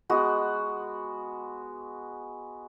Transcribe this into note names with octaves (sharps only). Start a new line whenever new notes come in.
G#3 B3 F#4